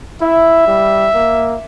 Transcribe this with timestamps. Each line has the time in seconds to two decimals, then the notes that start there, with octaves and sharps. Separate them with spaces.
0.21 E4 E5
0.67 G3
1.14 A#3